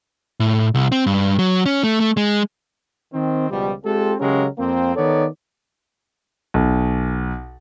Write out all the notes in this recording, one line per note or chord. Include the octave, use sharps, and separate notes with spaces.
A2
C2
C4
G2
F#3
C#4
A3
A3
G#3
D#3 C4
C#2 B2 F3 G3
G#3 C4 F4 G4 A4
C#3 F#3 G#3 C#4 G4 A#4
F2 A#3 C4
D#3 B3 D#4 A4 C#5 D5
B1